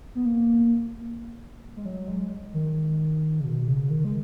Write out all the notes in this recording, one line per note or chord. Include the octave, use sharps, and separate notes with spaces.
B3
A#3
G#3
F#3
G#3
D#3
C#3
B2
C#3
D#3
G#3